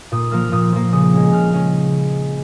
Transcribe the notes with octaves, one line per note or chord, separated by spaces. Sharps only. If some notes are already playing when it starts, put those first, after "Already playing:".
A#2 D#6
F3 A#3 F6
A#2 D#6
F3 A#3
C#3 D#6
G#3 C#4
C#3 F6
G#3 C#4